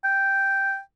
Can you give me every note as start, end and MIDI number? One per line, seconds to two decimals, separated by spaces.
0.05 0.80 79